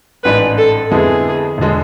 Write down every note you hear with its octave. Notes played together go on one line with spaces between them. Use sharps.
A1 G#2 G#3 D4 B4
A4
F2 D3 G#3 B3 E4 G#4
E1 D3 G#3